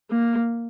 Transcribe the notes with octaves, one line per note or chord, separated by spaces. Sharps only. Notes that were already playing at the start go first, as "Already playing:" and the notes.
A#3